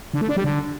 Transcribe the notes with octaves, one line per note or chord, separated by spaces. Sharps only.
D3
A3
D4
G3
D3